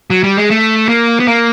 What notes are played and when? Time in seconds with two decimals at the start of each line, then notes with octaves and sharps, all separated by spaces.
0.10 F#3
0.24 G3
0.37 G#3
0.50 A3
0.89 A#3
1.20 B3
1.27 A#3